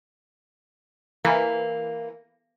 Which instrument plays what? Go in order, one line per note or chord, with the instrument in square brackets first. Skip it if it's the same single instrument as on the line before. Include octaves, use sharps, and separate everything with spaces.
[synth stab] E3 [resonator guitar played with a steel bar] A#3